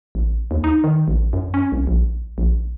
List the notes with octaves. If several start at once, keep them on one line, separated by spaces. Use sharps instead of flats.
A1
D#2
D#4
D#3
A1
F#2
C#4
C2
A#1
A#1